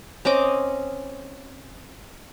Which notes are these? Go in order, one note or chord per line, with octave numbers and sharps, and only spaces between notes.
C4 C#4 D#5 D6